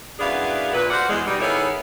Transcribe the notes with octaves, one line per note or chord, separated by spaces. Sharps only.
F#2 B3 D4 E4 G#4 F5
A#2 B4
F#4 C5 D5 F5 F#5
E2 G#3
B2 G3 D#4
D#3 B3 E4 G#4 A4 C#5